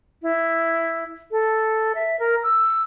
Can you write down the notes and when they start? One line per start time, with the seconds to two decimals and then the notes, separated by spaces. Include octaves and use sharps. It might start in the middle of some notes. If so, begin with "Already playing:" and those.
0.22 E4
1.31 A4
1.95 E5
2.20 A#4
2.43 E6